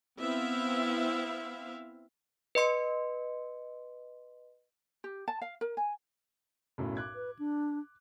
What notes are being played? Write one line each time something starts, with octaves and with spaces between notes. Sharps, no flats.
B3 C4 E4 E5 F5
B4 D#5 C6 C#7
G4
A5
F5
A#4
G#5
B1 F#2 A2
D6 F#6 G#6
B4
D4